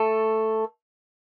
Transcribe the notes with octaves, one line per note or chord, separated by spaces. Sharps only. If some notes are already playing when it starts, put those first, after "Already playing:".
Already playing: A3 A4